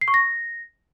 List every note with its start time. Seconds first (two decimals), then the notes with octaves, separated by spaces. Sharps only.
0.01 C7
0.08 C#6
0.14 A#6